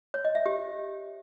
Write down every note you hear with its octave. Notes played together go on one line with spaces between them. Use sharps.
C#5
D#5
E5
G4